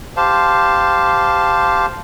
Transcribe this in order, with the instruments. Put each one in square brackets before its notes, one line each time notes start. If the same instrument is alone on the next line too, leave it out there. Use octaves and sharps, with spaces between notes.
[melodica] G4 C5 F5 A5